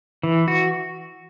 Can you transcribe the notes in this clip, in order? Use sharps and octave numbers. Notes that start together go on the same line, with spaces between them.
E3
F#4